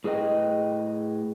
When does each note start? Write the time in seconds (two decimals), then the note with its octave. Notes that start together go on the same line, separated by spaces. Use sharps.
0.04 A2 G#4 B4 D#5 G5